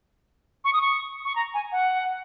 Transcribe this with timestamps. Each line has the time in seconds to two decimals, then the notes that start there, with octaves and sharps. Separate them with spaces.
0.65 C#6
0.73 D#6
0.82 C#6
1.25 C#6
1.36 A#5
1.54 G#5
1.72 F#5